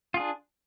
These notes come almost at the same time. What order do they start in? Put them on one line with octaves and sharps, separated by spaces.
F4 G#4 D4